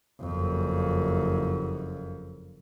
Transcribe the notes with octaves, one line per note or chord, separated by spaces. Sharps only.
F#1 F2